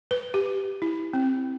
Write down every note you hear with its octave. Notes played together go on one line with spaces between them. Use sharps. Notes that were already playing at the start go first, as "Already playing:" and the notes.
B4
G4
E4
C4